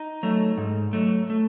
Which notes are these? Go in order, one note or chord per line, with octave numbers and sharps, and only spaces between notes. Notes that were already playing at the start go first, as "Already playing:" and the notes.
Already playing: D#4
F#3 A3
G#2
F#3 A3
A3